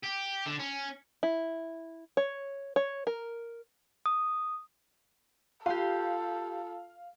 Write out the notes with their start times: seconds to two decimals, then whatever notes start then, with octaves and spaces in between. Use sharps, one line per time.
0.03 G4
0.46 D3
0.59 C#4
1.23 E4
2.17 C#5
2.76 C#5
3.07 A#4
4.06 D#6
5.66 F4 G4 A4 F5 C6